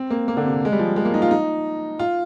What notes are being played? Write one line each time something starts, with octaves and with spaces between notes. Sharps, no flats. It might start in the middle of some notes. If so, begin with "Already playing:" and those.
Already playing: C4
A#3
A#3
D3
C3
G#3
G3
F3
G#3
A#3
D#4
F4
D#4
F4